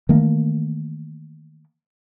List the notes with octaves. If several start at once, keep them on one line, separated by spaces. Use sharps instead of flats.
D#3 E3 A3 A#3